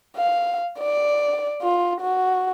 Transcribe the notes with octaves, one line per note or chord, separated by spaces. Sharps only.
F5
D5
F4
F#4